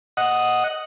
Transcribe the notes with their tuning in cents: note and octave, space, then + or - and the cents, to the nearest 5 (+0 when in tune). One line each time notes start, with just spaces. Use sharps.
D#5 +0 F#5 +0